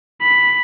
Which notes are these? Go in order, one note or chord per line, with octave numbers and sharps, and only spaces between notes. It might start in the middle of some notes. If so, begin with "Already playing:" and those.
B5